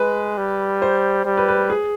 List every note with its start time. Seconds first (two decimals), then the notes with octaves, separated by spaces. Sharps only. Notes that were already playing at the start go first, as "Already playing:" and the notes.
Already playing: G#3 B4
0.37 G3
0.82 C5
1.25 G3
1.37 B4
1.48 B4
1.70 G#4